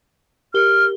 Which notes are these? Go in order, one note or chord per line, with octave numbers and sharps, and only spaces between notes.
G4 A#4 F6 G7